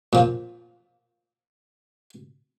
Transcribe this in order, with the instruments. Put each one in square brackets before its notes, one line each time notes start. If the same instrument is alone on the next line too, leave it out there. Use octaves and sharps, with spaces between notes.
[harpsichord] A#2 F3